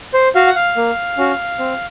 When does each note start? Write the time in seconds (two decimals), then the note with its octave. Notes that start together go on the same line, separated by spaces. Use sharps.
0.14 C5
0.35 F#4 F5
0.47 F#5
0.56 F5
0.76 A#3
1.18 C#4 F#4
1.59 C4